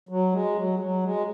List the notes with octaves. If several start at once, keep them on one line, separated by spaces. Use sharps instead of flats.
F#3
G#3
F#3
F#3
G#3